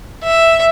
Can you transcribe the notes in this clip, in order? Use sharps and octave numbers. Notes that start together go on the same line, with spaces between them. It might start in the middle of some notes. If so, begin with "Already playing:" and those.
E5